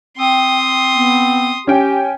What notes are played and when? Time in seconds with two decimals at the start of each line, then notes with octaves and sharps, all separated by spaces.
0.18 C4 G5 C6 D#6
0.95 B3
1.67 C#4 G4 G5 G#5